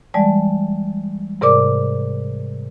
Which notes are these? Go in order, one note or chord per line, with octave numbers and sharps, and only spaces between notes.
E3 G3 G#3 D5 A5
G#2 C3 A#4 D5 D6